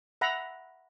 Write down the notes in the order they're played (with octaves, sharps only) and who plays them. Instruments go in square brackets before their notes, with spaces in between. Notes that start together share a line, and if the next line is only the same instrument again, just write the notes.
[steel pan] E5 F#5 A#5 B5